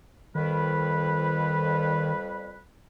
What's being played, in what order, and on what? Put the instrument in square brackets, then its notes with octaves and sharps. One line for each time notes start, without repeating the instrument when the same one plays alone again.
[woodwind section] F2 G3 B4 [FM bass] D#3